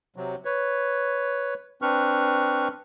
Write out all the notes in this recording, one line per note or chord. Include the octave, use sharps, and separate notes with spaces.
C3 F#3
B4 C#5
C4 D4 B4 C#6 F6